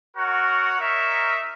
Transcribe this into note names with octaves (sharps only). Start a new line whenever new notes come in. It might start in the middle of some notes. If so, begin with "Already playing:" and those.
F#4 A#4 C#5 F#5
D#4 A#4 C#5 E5